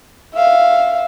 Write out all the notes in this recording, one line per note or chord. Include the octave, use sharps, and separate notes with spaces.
E5 F5